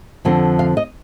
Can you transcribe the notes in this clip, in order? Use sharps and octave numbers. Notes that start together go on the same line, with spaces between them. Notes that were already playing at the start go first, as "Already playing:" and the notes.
F2 D3 F3 C4
F5
D#5